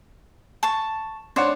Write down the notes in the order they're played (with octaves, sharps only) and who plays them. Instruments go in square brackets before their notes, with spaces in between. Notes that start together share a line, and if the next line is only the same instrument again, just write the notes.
[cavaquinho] A5 C#6
[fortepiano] D4 C#5 F#5 [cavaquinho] C5